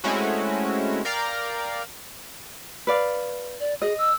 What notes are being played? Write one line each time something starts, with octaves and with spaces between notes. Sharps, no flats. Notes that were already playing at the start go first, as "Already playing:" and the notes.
G#3 A3 C4 C#4 E4 F#4
A#4 D5 F5 G5 A#5
B4 D5 F5
D5
G#4 D#5
E6